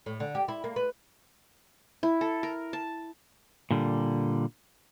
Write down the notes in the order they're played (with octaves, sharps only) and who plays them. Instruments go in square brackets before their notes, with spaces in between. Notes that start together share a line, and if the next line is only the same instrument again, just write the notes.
[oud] A2
D3
G4
E4
A#3
B4
[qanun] E4
A4
A#4
A5
[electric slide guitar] A#2 D3 G3